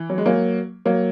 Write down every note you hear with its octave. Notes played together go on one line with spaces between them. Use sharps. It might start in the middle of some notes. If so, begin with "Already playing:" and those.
Already playing: E3
F#3
G#3
F#3 A#3
F#3 A#3